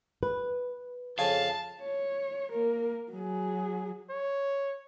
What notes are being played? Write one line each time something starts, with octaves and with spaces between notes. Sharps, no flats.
B4
F2 C#3 F5 G#5 A5
C#5
A#3 A#4
F#3 G#4
C#5